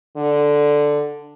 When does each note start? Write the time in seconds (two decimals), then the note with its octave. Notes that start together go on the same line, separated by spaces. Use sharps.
0.17 D3